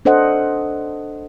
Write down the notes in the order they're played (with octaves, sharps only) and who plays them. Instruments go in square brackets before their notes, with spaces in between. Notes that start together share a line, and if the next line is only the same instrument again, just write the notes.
[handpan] D4 A4 C5 D#5 F#5